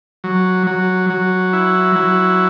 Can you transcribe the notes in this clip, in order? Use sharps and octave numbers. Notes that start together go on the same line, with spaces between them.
F#3
F#3
F#3
E4
F#3